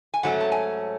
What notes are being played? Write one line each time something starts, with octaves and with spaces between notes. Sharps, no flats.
G#5
G#2 F#3 A3 C#4 F#5
A5
G#5